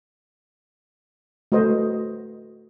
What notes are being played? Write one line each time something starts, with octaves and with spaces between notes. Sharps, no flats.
A3 F#4 B4 C5 D#5